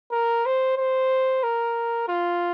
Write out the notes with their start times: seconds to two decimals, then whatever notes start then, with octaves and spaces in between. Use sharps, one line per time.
0.12 A#4
0.46 C5
0.77 C5
1.43 A#4
2.08 F4